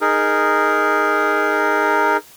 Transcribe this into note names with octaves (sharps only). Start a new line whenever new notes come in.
D#4 G#4 A#4